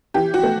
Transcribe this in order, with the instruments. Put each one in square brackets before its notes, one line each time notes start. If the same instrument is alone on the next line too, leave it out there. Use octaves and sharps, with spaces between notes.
[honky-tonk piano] E3 G4
F#4
A3